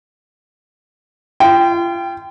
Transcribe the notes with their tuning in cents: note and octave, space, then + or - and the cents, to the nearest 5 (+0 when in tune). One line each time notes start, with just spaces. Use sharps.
F4 -35 G5 +0